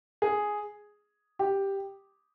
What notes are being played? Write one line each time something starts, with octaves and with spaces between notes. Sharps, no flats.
G#4
G4